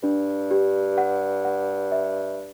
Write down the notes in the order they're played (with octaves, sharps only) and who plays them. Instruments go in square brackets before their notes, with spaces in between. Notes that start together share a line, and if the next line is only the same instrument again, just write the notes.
[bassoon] G2 [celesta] D4
[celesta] G4
F#5
F#5
E5